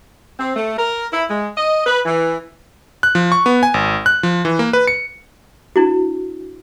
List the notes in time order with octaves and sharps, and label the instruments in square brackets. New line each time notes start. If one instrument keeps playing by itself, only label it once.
[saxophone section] C4
A3
A#4
E4
G#3
D#5
B4
E3
[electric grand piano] F#6
F3
C#6
B3
G#5
G#1
F#6
F3
E3
A#3
B4
C#7
[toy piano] D4 E4 F#4